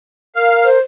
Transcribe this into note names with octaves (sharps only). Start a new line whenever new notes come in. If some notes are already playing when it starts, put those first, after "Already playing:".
A#4 F5
C5